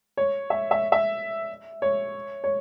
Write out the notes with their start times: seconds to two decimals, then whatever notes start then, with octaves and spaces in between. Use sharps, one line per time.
0.17 C#5
0.50 E5
0.71 E5
0.92 E5
1.82 C#5
2.44 C#5